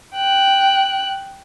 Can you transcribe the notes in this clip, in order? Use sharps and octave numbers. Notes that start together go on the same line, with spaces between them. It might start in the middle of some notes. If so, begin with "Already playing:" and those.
G5 F#6